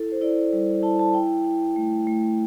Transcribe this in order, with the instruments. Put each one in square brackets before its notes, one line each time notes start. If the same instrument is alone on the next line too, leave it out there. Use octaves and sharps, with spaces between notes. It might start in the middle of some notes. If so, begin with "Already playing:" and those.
Already playing: [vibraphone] E4 A4
C5
E4 D5
G3
E4 A5
A5
E4 G5
E4
A3
A3